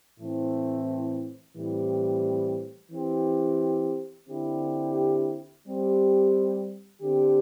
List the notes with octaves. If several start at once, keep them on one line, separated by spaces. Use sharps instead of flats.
A2 E3 A3 C4
A2 E3 G3 C4 G4
E3 C4 G4
D3 C4 E4 G4
G3 C4 G4
D3 C4 G4